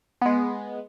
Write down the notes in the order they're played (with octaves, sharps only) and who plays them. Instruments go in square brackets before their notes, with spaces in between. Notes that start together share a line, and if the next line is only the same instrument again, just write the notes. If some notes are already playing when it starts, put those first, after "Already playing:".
[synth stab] G#3 B3